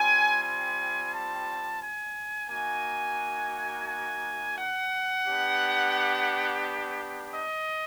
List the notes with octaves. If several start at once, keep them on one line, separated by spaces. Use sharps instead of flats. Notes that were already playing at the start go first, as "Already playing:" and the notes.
Already playing: G3 C4 F4 G#5
G#5
A5
G#5
A#3 D#4 F#4 G#5
G#5
F#5
B3 D4 G4
D#5